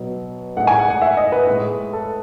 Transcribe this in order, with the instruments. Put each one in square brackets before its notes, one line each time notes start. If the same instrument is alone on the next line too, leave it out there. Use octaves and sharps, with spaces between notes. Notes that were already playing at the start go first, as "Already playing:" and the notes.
Already playing: [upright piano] B2 F#3
A2 G#3 F#5
G#5
F#5
F#5
E5
D#5
B4
A2 G#3
A4